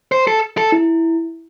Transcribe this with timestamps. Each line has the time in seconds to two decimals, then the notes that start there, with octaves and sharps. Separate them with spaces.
0.12 C5
0.27 A4
0.58 A4
0.72 E4